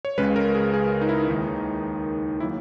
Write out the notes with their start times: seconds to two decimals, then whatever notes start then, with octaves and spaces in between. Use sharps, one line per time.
0.05 C#5
0.18 C#2 C#3 G#3 B4
0.36 A#4
0.55 G#4
0.74 G#4
1.01 D#4
1.09 E4
1.14 D#4
1.28 D#2 D#3 G#3
2.40 D#3 F#3 A#3 E4